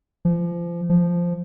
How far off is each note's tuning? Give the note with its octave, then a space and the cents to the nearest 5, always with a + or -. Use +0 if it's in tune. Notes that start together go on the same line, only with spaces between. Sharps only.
F3 -30
F3 -5